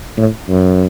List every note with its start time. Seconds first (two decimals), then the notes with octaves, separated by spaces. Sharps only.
0.17 A2
0.49 F#2